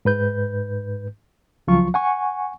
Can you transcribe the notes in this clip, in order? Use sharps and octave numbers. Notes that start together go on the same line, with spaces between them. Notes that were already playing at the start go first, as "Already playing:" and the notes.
G#2 B4 G6
C#2 F3 F#3 F4 C#6
F#5 G#5 C#6